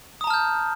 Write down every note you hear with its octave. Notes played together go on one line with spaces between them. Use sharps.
A5 A#5 D#6 F6 G6